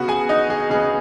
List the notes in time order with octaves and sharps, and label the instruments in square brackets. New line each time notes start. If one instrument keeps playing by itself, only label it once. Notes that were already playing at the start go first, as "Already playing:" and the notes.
Already playing: [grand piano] C#3 B3 F#4 F#5
G#4 G#5
D#4 D#5
G#4
C#3 B3 G#4